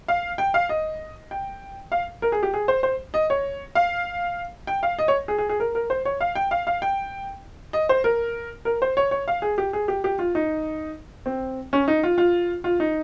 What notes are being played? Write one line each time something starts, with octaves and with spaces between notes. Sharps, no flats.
F5
G5
F5
D#5
G5
F5
A#4
G#4
G4
G#4
C5
C5
D#5
C#5
F5
G5
F5
D#5
C#5
G#4
G#4
G#4
A#4
A#4
C5
C#5
F5
G5
F5
F5
G5
D#5
C5
A#4
A#4
C5
C#5
C#5
F5
G#4
G4
G#4
G4
G4
F4
D#4
C4
C#4
D#4
F4
F4
F4
D#4